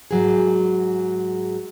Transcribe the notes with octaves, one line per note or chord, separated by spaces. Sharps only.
G#2 F#3 G#4